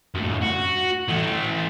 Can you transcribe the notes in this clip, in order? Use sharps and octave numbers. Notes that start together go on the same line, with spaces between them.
F#2 A2
F#4
E3 A3